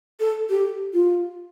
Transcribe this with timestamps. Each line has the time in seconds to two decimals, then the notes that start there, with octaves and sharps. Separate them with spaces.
0.20 A4
0.50 G4
0.93 F4